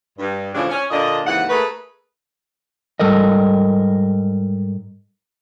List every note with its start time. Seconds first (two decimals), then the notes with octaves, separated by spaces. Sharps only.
0.19 G2
0.54 A2 C#3 E3 F3 G3 D4
0.69 C#4
0.90 A#2 D3 A#3 D4 D#5
1.25 D#2 G#2 C#3 E3 F#5
1.49 A3 A#3 G#4 A4 B4
3.00 G#2 G3 A4 A#4 D#5